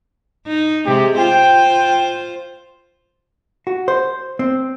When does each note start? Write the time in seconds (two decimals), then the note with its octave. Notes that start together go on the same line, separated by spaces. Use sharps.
0.47 D#4
0.86 C3 G#3 G4
1.18 F4 C5 G5
3.67 F#4
3.88 C5
4.39 C4